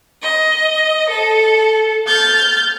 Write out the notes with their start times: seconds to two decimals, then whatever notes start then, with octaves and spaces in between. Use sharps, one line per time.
0.21 D#5
1.09 A4
2.06 F6 G6 A6